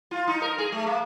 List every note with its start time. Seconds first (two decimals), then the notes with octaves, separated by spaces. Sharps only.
0.11 F4
0.27 D#4
0.42 A#4
0.58 G#4
0.72 A3
0.86 A#3